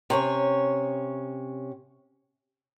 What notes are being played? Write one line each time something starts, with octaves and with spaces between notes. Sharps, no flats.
C3 C#4 C#5